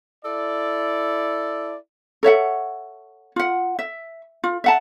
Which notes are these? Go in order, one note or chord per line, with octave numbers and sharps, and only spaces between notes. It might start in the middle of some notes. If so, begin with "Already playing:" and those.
E4 A4 D5
A4 C#5 E5 F#5
F4 F#5
E5
F4
E5 F#5 A5